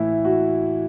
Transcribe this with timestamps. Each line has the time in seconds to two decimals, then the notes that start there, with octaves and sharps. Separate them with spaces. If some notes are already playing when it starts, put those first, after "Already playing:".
Already playing: A2 E3 E4
0.25 F#4